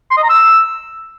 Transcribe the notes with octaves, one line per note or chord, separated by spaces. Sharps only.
C6
D#5
A#5
E6